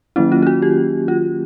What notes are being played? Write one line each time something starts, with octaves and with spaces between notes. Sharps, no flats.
D#3 F#3 A#3 C#4 E4
F4
F4
F#4
G4
F4